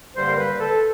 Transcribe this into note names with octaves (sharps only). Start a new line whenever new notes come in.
G2 D3 G3 A#3 C5
A#4
B4
A4